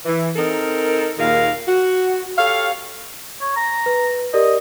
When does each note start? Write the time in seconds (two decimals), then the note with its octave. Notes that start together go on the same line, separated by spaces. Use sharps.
0.05 E3
0.36 C4 D#4 A4 A#4
1.18 D#2 A#2 D#3 G#4 A#4 F5
1.66 F#4
2.38 G4 A4 C#5 F5
3.41 C#5
3.56 A#5
3.86 B4
4.34 G4 A#4 D5 D#5